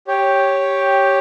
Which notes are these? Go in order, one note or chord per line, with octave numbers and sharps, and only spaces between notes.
G4 C#5 G5